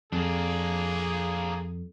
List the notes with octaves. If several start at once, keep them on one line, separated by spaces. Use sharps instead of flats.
F2 A#3 D4 G#4